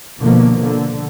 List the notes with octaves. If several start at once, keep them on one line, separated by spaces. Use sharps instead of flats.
B2 D3 F3 A#3
D3